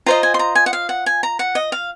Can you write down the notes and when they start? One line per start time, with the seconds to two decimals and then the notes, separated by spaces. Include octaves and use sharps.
0.06 F4 C5 D#5 A#5
0.23 G#5
0.34 C6
0.39 A#5
0.55 G#5
0.66 F#5
0.73 F5
0.89 F#5
1.06 G#5
1.23 A#5
1.39 F#5
1.55 D#5
1.72 F5